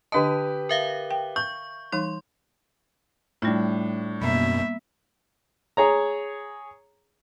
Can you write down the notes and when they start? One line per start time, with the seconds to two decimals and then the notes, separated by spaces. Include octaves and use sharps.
0.12 D3 D4 G4 B4 D#5 A5 D#6
0.69 A#4 E5 F5
1.11 G5
1.36 C#6 G6
1.92 E3 G3 D#4 C6
3.42 A2 G3 D4 F4
4.22 F#2 B2 A#3 B3 E5
5.77 G#4 C#5 A#5